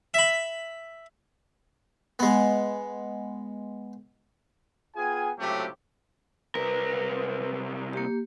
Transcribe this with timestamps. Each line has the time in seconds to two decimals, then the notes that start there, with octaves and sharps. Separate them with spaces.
0.14 E5 B5
2.19 G#3 B3
4.96 B3 F4 G#4 G5 G#5
5.39 C#2 A2 C3 F#3 A3 G4
6.55 C2 A#4 B4
7.93 A#3 G4